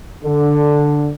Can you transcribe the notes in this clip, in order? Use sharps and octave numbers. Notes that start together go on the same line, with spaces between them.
D3